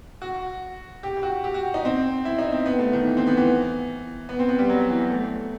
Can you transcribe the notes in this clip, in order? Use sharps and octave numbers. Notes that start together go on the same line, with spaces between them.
F#4
G4
G4
F#4
G4
F#4
D#4
C4
E4
D#4
C4
B3
A3
D#3
E3
C4
B3
E3
B3
C4
B3
G3
F#3
E3
A3